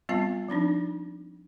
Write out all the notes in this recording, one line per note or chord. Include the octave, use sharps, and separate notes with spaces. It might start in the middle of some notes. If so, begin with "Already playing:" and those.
G3 B3 C4 F4 F5 A5
F3 C4 D4 D#4